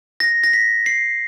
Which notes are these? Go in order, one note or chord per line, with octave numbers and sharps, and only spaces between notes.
A#6
A#6
B6
C7